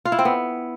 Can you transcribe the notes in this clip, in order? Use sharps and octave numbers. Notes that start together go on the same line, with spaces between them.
F4
E4
C4
B3